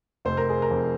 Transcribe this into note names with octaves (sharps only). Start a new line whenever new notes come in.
F1 C5
A#4
G#4
A#4
F2